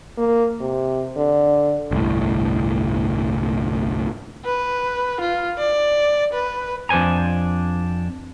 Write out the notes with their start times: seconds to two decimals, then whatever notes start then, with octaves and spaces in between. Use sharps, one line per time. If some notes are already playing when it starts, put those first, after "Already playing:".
0.18 A#3
0.61 C3
1.17 D3
1.91 G1 C2 A2
4.45 B4
5.20 F4
5.58 D5
6.33 B4
6.89 F2 D4 C5 G#5 A#5